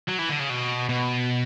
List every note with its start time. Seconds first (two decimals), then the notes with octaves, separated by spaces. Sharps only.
0.08 F#3
0.19 E3
0.29 D3
0.40 C#3
0.50 B2
0.89 B2